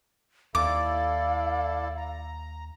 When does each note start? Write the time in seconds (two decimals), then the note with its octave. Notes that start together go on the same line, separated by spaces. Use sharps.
0.55 D#2 E4 A4 D5 F5 D6
1.97 A#5